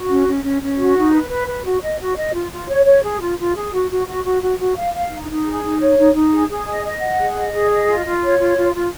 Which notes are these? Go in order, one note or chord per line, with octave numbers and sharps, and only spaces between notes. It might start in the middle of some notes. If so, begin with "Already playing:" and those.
Already playing: F#4
C#4
C#4
C#4
C#4
F#4
D#4
B4
B4
B4
F#4
D#5
F#4
D#5
F4
F4
C#5
C#5
G#4
F4
F4
G#4
F#4
F#4
F#4
F#4
F#4
F#4
F5
F5
D#4
D#4
G#4
D#4
C#5
D#4
D#4
G#4
G#4
D#5
D#5
F#5
G#4
D#5
G#4
D#5
F4
F4
C#5
F4
F4
F4